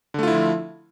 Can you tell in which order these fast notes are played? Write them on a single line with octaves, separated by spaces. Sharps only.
D3 A3 F4 E4 F3